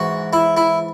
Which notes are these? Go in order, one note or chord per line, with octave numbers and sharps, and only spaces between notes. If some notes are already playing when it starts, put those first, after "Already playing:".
Already playing: G#2 E3 F#4
E4
E4